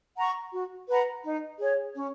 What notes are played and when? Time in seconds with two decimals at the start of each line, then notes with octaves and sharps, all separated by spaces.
0.17 F#5 A#5 C#6
0.52 F#4
0.88 B4 F#5 A#5
1.24 D#4
1.59 G#4 C#5
1.94 C#4